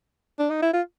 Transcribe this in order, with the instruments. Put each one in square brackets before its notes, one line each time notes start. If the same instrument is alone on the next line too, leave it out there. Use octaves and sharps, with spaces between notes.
[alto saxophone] D4
D#4
E4
F4